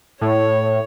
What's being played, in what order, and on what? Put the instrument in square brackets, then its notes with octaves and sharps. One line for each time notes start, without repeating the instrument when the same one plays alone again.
[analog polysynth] A2 [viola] C#5